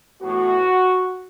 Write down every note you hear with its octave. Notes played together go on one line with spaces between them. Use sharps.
A2 E3 B3 F#4